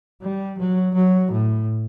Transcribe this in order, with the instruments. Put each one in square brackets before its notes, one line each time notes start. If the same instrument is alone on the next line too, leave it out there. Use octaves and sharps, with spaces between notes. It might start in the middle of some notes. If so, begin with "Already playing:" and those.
[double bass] G3
F#3
F#3
A2